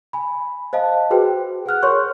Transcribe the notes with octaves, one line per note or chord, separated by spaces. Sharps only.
G#5 B5
C5 D#5 F5 A5
F#4 G#4 B4 C5 G5
G#4 F#5 F6 F#6
A#4 C#5 C6 C#6